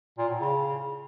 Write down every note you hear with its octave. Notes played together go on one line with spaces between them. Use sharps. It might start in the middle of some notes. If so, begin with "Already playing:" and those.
A#2
A2
C#3